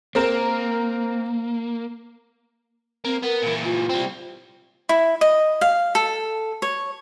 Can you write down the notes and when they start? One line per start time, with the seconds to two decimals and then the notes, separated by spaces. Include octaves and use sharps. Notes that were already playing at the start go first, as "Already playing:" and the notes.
0.15 A#3 C4 A#4 E7
3.05 A#3 C4
3.23 B3 A#4
3.43 A#2 E3
3.65 F4
3.89 G3 C4
4.89 E4
5.21 D#5
5.61 F5
5.95 A4
6.62 C#5